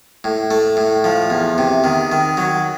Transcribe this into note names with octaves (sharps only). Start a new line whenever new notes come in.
A2
A3
A2
F3
E2
C3
D#3
D#3
F#3